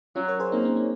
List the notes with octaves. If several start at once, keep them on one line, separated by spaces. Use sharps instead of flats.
F#3 C#4 F4
A#4 C#5
G#4 C5
A#3 C4 D#4
C#4
C#4